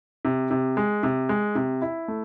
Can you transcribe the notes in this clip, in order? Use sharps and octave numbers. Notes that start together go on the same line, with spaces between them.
C3
C3
G#3
C3
G#3
C3
E4
A3